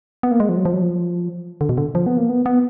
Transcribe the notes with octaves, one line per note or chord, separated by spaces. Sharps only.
B3
A#3
G#3
F3
F#3
F3
F#3
F3
D3
B2
D3
F3
B3
A#3
B3
B3